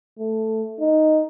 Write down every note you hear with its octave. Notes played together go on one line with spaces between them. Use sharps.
A3
D#4